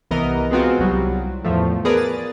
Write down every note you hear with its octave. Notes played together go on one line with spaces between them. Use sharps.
C2 E3 B3 A#4 D#5
G#3 B3 C4 F4 F#4
C2 F#3 G3
E2 A2 F3 A3
B3 G#4 A#4 B4 D5
A6